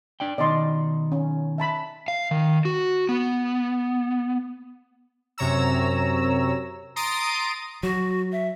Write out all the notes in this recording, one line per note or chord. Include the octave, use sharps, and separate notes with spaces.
D4 D5 G5
B2 D#3 D5 D#5 C6
C#4
E5 A5 B5
F5
D#3
F#4
B3
F#2 C3 C#5 A#5 E6
A#5 C6 D#6 A6 D7 D#7
F#3 F#4
E5